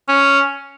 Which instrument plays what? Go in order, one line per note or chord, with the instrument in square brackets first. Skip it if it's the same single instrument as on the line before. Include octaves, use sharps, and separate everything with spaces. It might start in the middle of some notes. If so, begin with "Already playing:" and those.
[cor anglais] C#4